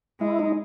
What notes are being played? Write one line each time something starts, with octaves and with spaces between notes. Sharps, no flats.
G#3 E4
D#4